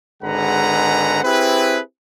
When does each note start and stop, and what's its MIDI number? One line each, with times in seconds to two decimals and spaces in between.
0.23 1.20 32
0.23 1.20 50
0.23 1.20 56
0.23 1.20 71
0.23 1.20 78
0.23 1.20 82
1.23 1.79 60
1.23 1.79 64
1.23 1.79 67
1.23 1.79 68
1.23 1.79 71